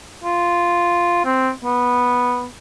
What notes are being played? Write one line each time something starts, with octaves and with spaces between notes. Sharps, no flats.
F4
C4
B3